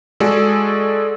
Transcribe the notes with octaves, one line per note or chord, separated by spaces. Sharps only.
G#3 F#4 G#4 A4 D5 E6